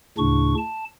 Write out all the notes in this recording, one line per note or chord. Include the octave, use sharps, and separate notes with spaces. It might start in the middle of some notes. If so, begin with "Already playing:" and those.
D2 A2 C#3 D4 C#6
A5